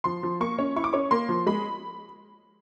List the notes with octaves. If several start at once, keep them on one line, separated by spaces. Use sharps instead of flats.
F3 C6
F3
A#3 C#6
C#4
E4 C#6
D6
C#4 C#6
A#3 C6
F3
G#3 B5